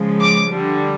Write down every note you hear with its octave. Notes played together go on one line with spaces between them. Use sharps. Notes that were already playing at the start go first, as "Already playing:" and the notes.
Already playing: C#3 F3 G#3
D6
D3 G3